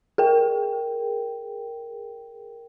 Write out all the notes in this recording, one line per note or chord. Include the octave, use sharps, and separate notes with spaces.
G#4 A#4 G5